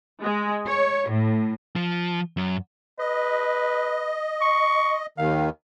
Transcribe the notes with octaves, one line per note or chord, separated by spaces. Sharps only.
G#3
C#5
A2
F3
F#2
B4 D#5
C#6
D#2 D#3 F5